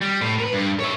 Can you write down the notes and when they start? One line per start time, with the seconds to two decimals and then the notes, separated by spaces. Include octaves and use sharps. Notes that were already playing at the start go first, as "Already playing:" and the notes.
0.02 G3
0.22 A2
0.39 A#4 B4
0.53 G2
0.80 C#5 E5